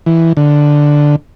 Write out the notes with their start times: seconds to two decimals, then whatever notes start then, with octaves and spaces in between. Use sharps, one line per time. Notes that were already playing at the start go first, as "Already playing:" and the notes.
0.06 E3
0.37 D3